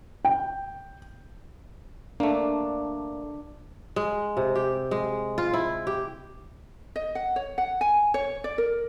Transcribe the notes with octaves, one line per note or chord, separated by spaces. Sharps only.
G5
A3 A#3 D4
G#3
C3
G4
G#3
F4
E4
G4
D#5
F#5
C#5
F#5
G#5
C#5
D5
A#4